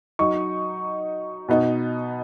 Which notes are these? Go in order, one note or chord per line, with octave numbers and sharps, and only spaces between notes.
F#3 D#4 C#6
B2 B3 D#4